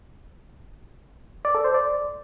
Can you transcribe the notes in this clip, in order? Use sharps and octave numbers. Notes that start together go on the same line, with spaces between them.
D5
A4
C5
D5